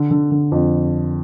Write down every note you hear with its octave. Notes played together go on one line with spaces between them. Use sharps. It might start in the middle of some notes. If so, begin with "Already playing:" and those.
Already playing: D3
D3
D3
F2